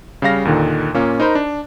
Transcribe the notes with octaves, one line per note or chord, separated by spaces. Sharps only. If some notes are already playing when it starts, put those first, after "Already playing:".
C#3 G3 F5 A#6
D#2 A#2 D3 D#3
A#2 A#3 C#4 F4
D#4 A#4 C5 B5
D4